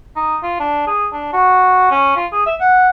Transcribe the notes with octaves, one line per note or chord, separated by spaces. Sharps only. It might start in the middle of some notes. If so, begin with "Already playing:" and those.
D#4
F4
D4
G#4
D4
F#4
C#4
F4
G#4
E5
F#5